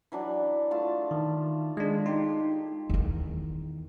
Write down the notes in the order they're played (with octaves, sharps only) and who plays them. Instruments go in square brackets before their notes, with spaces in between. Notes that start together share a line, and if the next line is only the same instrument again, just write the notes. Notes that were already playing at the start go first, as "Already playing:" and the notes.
[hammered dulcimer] E3 F#3 D4
A3 F4 A5
[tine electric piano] D#3
G#3 D4
[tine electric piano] D#4 [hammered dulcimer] G4 C6
[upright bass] E2 D#3